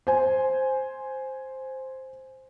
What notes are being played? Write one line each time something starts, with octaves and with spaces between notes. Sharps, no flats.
C5 G#5